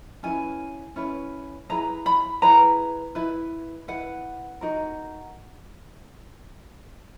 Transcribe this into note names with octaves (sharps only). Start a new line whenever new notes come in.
C#4 E4 B4 G#5
C#4 E4 B4
E4 G#4 B4 A#5
B5
E4 G#4 B4 A#5
E4 B4
E4 B4 F#5
D#4 F#4 A#4